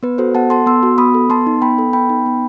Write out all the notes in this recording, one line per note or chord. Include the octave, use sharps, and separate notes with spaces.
B3 B4
F#4 A4 C5
B3 F#5 A5
A4 A5 C6
B3 C6 E6
F#4
B3 B5 D#6
A4
B3 A5 C6
D#4
B3 G5 B5
A4
B3 G5 B5
D#4
B3